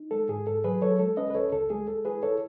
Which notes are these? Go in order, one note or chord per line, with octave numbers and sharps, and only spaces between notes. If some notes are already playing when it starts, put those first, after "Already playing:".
Already playing: D#4
G#3 A4
G#2 G#4
G#2 A4
F#3 G#4 B4
F#3 A4 C#5
G#3 A4
C#4 B4 D#5
B4
C#2 A4 C#5
C#2 A4
G#3 G#4
G#3 A4
E4 G#4 B4
E4 A4 C#5